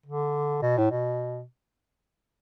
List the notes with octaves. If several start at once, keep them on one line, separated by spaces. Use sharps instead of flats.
D3
B2
A2
B2